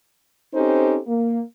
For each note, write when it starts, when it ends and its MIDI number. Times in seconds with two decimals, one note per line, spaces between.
0.53 0.99 60
0.53 0.99 61
0.53 0.99 63
0.53 0.99 67
0.53 0.99 69
0.53 0.99 72
1.06 1.40 58